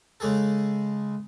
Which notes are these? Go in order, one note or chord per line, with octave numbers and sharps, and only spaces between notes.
C#3 G#3 G#4 A4